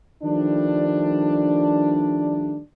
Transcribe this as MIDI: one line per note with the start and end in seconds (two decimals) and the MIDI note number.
0.23 2.58 51
0.23 2.58 53
0.23 2.58 55
0.23 2.58 57
0.23 2.58 62